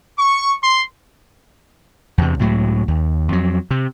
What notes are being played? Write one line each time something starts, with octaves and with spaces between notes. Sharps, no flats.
C#6
C6
E2 C3
C#2 A2 F#3
D#2
F2 F#3
C3